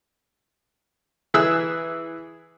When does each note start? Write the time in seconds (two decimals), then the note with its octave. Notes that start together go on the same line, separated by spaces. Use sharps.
1.34 E3 G#4 E5 E6 F#6